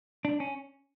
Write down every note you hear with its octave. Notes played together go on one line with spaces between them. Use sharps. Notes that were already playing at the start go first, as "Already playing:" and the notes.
D4
C#4